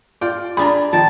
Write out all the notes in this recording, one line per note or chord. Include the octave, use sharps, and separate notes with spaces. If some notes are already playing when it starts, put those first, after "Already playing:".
F4 D5 G5
D4 F4 G#4 A#5 B5
D#3 F3 A5